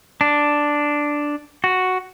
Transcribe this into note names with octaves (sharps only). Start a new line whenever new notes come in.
D4
F#4